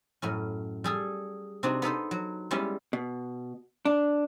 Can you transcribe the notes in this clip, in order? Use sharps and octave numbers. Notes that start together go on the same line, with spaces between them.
F#2 A2 C#4
G3 G#4 A4
C3 C4 D4 D#4 F#4
B3 D#4 A4 C5
F#3
G3 G#3 B3 C#4 E4 G4
B2
D4